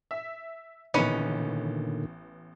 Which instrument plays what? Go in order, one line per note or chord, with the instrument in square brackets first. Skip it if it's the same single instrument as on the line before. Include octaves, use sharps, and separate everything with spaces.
[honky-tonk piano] E5
[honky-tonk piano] A1 B3 [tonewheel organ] A#2 D3 D#3 [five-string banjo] C#4 D#4 B4